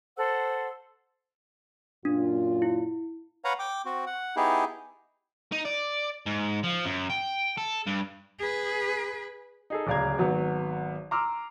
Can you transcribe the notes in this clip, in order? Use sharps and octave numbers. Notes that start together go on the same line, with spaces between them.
A4 C5 F#5 E6
F#2 A#2 D4 F4
E4
B4 C#5 F5 F#5 A#5
G5 D6
C4 F#4
F#5
B3 D#4 E4 G4 G#4
D#4
D5
G#2
F3
F#2
G5
A4
G2
G#4 B4
D#4 G#4 A4
D1 C#2 D5 F5 A#5 G#6
G#1 F#3 B3
A#5 C6 D6 E6 F6